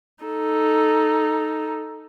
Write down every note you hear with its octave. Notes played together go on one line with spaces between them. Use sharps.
D#4 A4